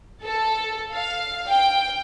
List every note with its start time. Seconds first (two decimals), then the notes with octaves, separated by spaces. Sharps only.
0.24 A4
0.94 F5
1.50 G5